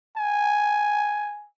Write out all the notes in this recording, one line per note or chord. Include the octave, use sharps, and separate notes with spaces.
G#5